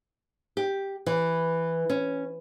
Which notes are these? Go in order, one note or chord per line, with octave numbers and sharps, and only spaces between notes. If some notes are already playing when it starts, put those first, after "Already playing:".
G4
E3
C#4